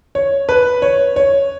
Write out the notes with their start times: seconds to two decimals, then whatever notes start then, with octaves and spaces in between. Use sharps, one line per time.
0.15 C#5
0.49 B4
0.82 C#5
1.16 C#5